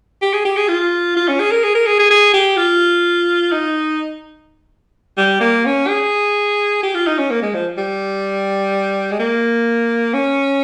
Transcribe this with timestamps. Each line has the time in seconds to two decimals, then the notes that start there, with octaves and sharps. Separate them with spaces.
0.22 G4
0.33 G#4
0.45 G4
0.57 G#4
0.68 F4
1.16 F4
1.28 C#4
1.40 G#4
1.51 A#4
1.64 G#4
1.75 A#4
1.87 G#4
1.99 G#4
2.11 G#4
2.34 G4
2.57 F4
3.52 D#4
5.18 G3
5.41 A#3
5.65 C#4
5.88 G#4
6.83 G4
6.95 F4
7.07 D#4
7.18 C#4
7.31 A#3
7.42 G#3
7.54 F3
7.78 G3
9.11 G#3
9.19 A#3
10.14 C#4